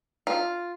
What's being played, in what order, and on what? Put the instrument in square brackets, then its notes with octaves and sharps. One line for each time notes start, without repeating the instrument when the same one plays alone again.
[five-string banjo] F4